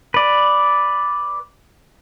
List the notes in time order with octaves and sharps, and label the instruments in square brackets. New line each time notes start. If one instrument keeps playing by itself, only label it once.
[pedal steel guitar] B4 D5